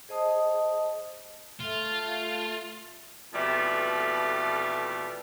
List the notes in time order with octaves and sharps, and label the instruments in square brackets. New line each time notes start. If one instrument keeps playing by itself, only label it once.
[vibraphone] G#4 C5 D#5 A5 D#6
[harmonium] A3 [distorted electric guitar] F4
[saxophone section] F2 B2 E3 G3 A3